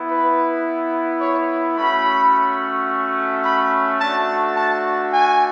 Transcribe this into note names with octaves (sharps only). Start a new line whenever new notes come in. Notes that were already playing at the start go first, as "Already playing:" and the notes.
Already playing: B3 E4
B4
C#5
A3 C#4 F#4 B5
B5
A3 D4 F#4 A5
A5
G#5